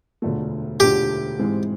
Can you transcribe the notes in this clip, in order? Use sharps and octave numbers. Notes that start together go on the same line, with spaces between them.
E1 D2 D3 F3 A3
E1 D2 D3 F3 A3 G4
G#2 E3 G#3 C4